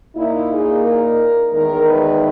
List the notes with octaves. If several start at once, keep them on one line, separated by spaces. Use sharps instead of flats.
A#2 A#3 D#4 E4
G#4
A#4
E2 D#3 G#3 A#4
B4